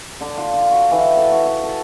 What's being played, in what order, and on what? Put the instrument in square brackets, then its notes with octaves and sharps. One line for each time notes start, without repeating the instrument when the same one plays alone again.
[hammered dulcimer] D3
F4
F4
F#4
E3
A4
F#4
F#4
A4